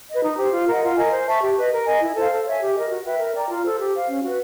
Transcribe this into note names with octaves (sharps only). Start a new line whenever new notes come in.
B4 D#5
D#4
G4 C5
F4
A#4 D#5 F#5
F4
A#4 D#5 G#5
C5
E5 A5 C#6
G4
B4 D#5
A#4
D#5 G#5
E4
A4 C5 F5
A4
C#5 E5 G#5
G4
A#4 D#5
F#4
B4 E5 G5
A#4
D5 G5 A#5
F4
A4 C5
G4
C5 F5
C#4
F#4 B4